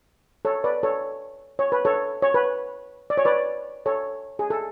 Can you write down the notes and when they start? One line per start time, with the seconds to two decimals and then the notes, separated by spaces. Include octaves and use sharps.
0.45 A4 C#5
0.64 B4 D5
0.83 A4 C#5
1.59 C#5
1.72 B4
1.85 A4 C#5
2.22 C#5
2.34 B4
3.10 D5
3.17 C#5
3.25 B4 D5
3.86 A4 C#5
4.39 G#4
4.50 A4